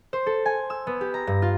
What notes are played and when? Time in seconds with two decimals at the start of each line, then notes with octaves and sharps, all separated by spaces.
0.13 C5
0.26 A4
0.46 G#5
0.70 E6
0.87 B3
1.01 G4
1.14 A#5
1.27 G2
1.42 F4